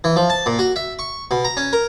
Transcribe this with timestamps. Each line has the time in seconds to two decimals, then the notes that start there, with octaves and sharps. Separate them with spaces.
0.04 E3
0.16 F3
0.30 A5
0.46 A#2
0.59 F#4
0.76 E5
0.99 C#6
1.31 B2
1.45 A#5
1.57 C#4
1.73 A#4